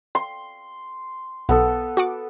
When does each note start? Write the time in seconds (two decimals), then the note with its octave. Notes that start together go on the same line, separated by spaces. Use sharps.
0.15 C6
1.49 B1 B3 A4
1.97 F#4 F#5 D6